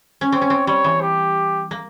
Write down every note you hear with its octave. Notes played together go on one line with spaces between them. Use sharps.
C#4
C4 C#5
C#4
C4
G3 C#5
E3
G4
A#3